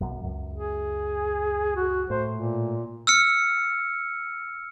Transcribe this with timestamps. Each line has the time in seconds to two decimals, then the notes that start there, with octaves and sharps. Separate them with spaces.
0.01 B1 F#2
0.23 C#2 F#2
0.54 G#4
1.76 F#4
2.10 A2 C5
2.32 A#2
3.07 E6 F6 C#7